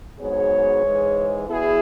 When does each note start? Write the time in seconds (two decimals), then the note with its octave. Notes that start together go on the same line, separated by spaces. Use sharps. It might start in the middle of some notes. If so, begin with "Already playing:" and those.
0.20 G#2 F#3 B3 G#4 C#5
0.85 G#2 E3 G#3
1.49 E2 B2 B3 E4 G#4